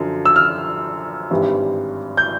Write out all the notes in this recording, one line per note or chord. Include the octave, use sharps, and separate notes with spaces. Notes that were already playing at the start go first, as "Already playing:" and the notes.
Already playing: F#2 D3 F3
E6
F6
G#1 G2 E3 G3
G6